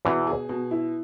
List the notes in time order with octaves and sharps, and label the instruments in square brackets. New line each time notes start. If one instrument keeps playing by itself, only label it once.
[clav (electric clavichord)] E2 E3 [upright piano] B2
[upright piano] G#4
B2
E4